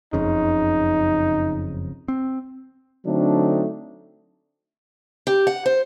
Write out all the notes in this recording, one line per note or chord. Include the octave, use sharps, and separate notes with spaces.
F#1 F2 C#3 D#4
C4
D3 F#3 A3 C4 D4 D#4
G4
F#5
C5